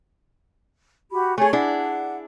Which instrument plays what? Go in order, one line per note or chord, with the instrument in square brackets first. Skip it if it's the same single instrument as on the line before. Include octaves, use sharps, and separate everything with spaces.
[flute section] F#4 G4 B5
[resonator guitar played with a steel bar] A3 G#4 [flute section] C#5 G#5
[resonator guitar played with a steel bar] D4 E4 G#4 [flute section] F#5